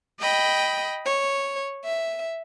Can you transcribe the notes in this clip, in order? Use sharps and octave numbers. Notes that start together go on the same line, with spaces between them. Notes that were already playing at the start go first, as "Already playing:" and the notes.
D#5 G5 B5
C#5
E5